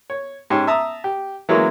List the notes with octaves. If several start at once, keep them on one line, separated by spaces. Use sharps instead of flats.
C#5
G#2 C#4 G4
E5 A5 A#5 D#6
G4
E3 F#3 G#3 A#3 C#4